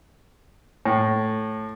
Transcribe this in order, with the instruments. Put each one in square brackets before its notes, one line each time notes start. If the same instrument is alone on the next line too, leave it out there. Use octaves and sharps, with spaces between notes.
[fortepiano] A2